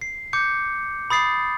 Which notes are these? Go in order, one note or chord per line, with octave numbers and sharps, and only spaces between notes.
C7
D6 G6 C#7
B5 D#6 A6 C7